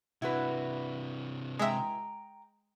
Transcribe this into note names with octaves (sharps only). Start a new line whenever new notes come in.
C3 D4 E4 F#4 B4
G#3 E5 G5 A#5